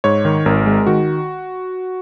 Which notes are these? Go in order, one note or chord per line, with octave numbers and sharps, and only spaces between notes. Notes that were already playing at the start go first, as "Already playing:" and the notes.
G#2 C#5
D#3
G#1 A#4
G#3
D#3 F#4